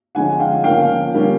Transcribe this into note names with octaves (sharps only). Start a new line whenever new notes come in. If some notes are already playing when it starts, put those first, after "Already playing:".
D3 F3 G#3 C#4 F#5 G#5
F5 G5
C#3 F3 A#3 C#4 F5 G5
D3 G3 A#3 C#4